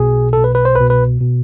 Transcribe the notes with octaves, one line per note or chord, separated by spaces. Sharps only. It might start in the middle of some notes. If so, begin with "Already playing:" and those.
Already playing: B1 B2 G#4
B1 B2 A4
B4
B4
C5
C2 B2 B4
B4
B2